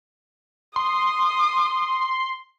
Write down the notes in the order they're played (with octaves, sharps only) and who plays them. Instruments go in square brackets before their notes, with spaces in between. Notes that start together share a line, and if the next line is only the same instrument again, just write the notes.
[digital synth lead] C6 [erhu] D#6